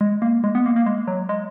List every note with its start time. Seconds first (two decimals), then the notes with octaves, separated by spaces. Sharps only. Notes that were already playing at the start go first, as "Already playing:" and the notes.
0.01 G#3
0.22 A#3
0.44 G#3
0.55 B3
0.66 A#3
0.76 A#3
0.86 G#3
1.07 F#3
1.29 G#3